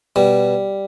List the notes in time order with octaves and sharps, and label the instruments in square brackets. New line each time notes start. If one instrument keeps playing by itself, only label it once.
[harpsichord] B2 G3